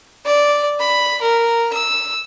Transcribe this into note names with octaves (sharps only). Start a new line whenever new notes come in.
D5
B5
A#4
E6